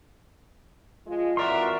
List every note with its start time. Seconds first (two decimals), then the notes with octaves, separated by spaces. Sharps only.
1.06 F3 G#3 F4
1.37 F2 E3 F#4 A#4 D5 E5 C6